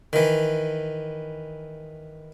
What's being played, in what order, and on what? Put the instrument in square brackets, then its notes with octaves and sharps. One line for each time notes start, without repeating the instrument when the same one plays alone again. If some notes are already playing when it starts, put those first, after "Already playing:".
[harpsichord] D#3 E3